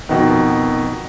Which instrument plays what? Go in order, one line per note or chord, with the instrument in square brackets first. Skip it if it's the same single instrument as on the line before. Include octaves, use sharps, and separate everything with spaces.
[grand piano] F2 B2 D#3